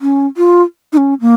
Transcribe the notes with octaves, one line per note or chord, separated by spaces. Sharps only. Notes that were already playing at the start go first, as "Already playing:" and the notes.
C#4
F4
D#4
C#4
A#3